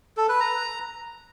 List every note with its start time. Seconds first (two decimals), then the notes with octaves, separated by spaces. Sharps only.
0.17 A4
0.29 B4
0.40 A#5